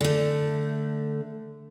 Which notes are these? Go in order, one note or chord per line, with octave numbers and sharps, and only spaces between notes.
D3 A3